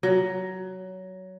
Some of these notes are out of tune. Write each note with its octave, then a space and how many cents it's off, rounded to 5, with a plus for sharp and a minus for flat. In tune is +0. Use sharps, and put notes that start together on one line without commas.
F#3 +15